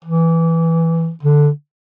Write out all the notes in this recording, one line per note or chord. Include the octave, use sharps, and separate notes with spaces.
E3
D3